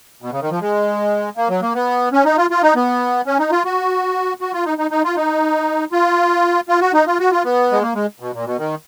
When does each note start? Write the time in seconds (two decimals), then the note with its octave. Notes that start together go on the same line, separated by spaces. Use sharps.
0.22 B2
0.32 C#3
0.41 D#3
0.51 F3
0.61 G#3
1.37 A#3
1.49 F#3
1.62 A#3
1.75 B3
2.12 C#4
2.25 D#4
2.38 F4
2.50 F4
2.63 D#4
2.76 B3
3.26 C#4
3.39 D#4
3.51 F4
3.65 F#4
4.41 F#4
4.53 F4
4.66 D#4
4.78 D#4
4.91 D#4
5.04 F4
5.16 D#4
5.92 F4
6.69 F4
6.81 F#4
6.94 D#4
7.07 F4
7.19 F#4
7.31 F4
7.45 B3
7.72 G#3
7.82 A#3
7.95 G#3
8.20 B2
8.33 A#2
8.46 B2
8.58 D#3